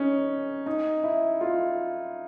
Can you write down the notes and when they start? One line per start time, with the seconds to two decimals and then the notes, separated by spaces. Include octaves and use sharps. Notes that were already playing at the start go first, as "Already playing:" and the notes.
Already playing: C#4 D#4
0.66 D#4
1.04 E4
1.41 F4